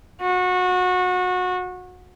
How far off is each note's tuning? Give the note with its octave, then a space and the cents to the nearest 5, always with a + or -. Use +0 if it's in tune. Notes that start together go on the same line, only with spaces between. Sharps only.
F#4 -25